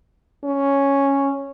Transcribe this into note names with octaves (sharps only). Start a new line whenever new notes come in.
C#4